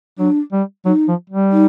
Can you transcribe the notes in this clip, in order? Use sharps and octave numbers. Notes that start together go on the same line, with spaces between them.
F#3 D4
G3
F#3 D#4
F3
G3
D#4